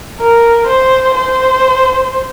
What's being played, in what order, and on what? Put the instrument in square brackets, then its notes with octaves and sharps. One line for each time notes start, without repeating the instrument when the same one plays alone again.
[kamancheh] A#4
C5
C5